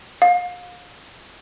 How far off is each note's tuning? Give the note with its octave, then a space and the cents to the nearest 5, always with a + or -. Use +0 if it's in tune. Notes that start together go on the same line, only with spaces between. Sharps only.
F5 +35